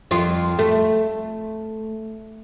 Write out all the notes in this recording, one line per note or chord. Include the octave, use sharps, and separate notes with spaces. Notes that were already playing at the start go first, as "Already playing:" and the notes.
F2 F4
A3